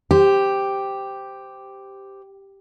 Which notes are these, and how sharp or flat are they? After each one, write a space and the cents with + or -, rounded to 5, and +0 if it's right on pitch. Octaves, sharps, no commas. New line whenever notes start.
G4 +0 C5 -15